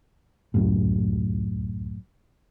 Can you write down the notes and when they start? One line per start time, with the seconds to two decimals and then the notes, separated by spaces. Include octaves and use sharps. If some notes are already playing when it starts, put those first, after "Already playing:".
0.54 D1 C#2 F#2 A2